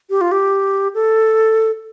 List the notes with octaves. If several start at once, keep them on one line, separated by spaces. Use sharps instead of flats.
G4
F4
G4
A4